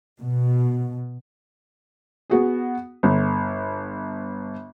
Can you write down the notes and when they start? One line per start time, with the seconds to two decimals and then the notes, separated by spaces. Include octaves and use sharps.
0.20 B2
2.30 B3 F#4 G#4
3.03 G1